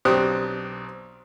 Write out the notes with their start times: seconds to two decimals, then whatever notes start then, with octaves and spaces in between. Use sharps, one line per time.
0.05 B1 C4 D4 G4 D#6 F#6